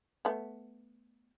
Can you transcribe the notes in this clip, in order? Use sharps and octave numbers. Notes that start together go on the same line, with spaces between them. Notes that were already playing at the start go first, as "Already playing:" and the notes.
A3 B3